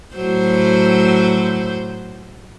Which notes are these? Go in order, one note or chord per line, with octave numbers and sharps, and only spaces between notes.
A2 F#3 C5